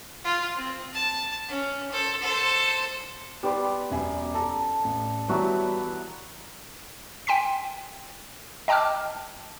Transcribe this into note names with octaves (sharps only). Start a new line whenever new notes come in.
F4
C4
A5
C#4
A4 C5
A4 C5
G3 B3 D5 B5 C6
E1 F#2 G#5
A4 A5 A#5
A1
E3 F#3 G3 B3 F#4 E5
G5 G#5 C6 B6
D#5 G5 A5 D6 E6 F6